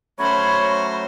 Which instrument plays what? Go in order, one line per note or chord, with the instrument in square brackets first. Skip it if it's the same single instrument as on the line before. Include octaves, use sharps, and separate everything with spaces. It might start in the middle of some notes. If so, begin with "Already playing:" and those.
[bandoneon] F#3 A3 F#4 [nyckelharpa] C#4 C5 [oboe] C#5 [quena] B5